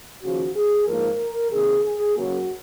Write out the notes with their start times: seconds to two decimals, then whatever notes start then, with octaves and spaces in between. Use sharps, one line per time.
0.22 D#2 C#3 F3 F#4
0.54 G#4
0.87 G#2 F3 A#3 A#4
1.51 C3 D#3 A#3 G#4
1.83 G#4
2.16 F#2 C#3 F#3 A#3 F#4